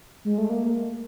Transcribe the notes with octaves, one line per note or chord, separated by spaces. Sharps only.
G#3
A3
A#3